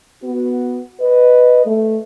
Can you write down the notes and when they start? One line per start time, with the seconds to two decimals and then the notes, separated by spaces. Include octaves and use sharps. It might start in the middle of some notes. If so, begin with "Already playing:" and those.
0.23 B3 F#4
1.00 B4 D#5
1.66 A3